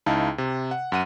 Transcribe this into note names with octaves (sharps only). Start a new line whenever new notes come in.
C#2 D#4 E4 F5 A5
C3
F#5
F#2 F#5 D#7